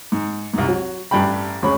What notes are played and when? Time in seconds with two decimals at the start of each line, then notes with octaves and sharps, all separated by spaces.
0.12 G#2
0.54 C2 G#2
0.68 F#3
1.11 A1 G2 A3 G5 B5
1.62 D2 G#3 C#4 B5 C#6